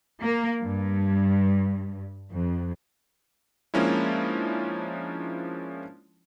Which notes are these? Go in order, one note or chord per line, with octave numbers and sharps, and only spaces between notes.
A#3
G2
F2
F3 G#3 A#3 C#4 D4 E4